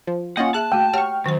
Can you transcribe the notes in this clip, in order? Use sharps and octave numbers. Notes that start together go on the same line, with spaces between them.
F3
A#3 C#4 F4 D#5 F#5
G#4 E5 A5 F#6
A3 F#4 G5
G4 C#5 F#5 C#6 F6
F#2 D#3 C5